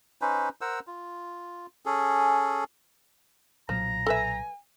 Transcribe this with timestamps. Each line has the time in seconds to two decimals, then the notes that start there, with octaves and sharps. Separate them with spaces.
0.22 C#4 D#4 B4 C5
0.61 A#4 C5 F#5 E6
0.87 F4
1.86 C#4 G#4 A4
3.69 B1 A#2 F3 F#3 A#5
4.06 A4 B4 E5 G#5